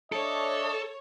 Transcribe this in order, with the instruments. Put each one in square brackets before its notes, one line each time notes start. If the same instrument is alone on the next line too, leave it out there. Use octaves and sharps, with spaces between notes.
[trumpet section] D4 D#5 E5 [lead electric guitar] A4 [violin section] C#5